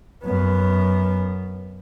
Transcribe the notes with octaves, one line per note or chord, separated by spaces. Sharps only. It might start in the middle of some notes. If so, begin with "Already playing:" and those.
F#2 B3